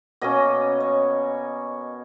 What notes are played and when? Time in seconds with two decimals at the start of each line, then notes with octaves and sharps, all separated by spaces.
0.21 B2 A#3 C#4 D#5
0.80 C#5